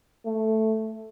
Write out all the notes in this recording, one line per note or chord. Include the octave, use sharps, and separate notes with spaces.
A3